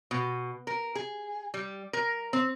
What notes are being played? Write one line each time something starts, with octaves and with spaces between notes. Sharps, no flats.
B2
A#4
G#4
G3
A#4
C4